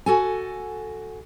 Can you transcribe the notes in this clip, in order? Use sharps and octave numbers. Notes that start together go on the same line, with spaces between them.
F#4 A4 G#5